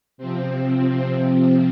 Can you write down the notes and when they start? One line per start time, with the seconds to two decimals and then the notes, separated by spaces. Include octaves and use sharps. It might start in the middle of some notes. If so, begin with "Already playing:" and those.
0.18 C3 F3 C4
0.62 C4